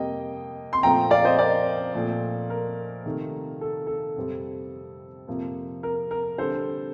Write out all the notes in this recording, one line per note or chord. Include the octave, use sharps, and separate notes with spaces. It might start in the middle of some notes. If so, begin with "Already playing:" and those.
Already playing: F2 C3 G3 A#3 D#5 G5
C6
A#2 F3 A3 C4 G5 A#5
D5 F5
C5 D#5
A#4 D5
A#2 F3 A3 C4
A#4
C3 D#3 A3
A4
A4
F2 C3 G3 C4
F2 C3 F3 A#3
A#4
A#4
D3 G3 C4 A4 C5